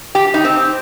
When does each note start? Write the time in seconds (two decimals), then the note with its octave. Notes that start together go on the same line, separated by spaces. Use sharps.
0.15 G4
0.34 D#4
0.45 C4